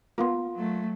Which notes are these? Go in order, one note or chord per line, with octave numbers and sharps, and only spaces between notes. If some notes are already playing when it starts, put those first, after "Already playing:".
A#3 B3 F4 F5 C6
F#3 A3